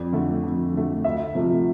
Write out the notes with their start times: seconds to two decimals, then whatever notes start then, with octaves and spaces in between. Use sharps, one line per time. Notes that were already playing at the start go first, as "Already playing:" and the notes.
Already playing: F2 D5
0.13 D3 A3
0.43 F2
0.74 D3 A3
1.04 D2 E5
1.35 C3 F3 A3